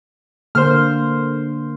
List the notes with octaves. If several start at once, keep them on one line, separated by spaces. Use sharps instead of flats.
D3 A#3 C5 F6